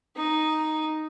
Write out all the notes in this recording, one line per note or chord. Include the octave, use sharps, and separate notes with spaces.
D#4